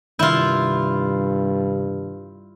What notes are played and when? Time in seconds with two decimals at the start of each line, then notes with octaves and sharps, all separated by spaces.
0.19 G2 C3 D#3 E4 F4 G6